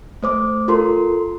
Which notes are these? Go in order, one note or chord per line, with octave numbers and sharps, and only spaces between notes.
A3 C5 D6
F4 A4 A#4 C6